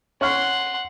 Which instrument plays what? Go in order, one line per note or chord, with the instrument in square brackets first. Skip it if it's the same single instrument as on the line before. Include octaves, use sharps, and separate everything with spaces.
[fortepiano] C#4 C#6 F6 [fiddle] F#5 C6